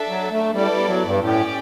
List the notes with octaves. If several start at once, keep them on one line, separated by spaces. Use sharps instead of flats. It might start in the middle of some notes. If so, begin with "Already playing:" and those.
Already playing: D4 A4 E5
F#3
A3
G3 B3 E4 A4 D5
G3
F#3
G2
A2 C#4 G4 D5